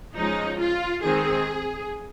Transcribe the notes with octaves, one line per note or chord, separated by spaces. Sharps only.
F3 G#3 C#4 D#4
F4
D#3 G#3 C4 G#4